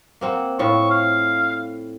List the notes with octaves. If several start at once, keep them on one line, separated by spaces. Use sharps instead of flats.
A#3 C4 F#5
A2 C4 F4 C#6
F5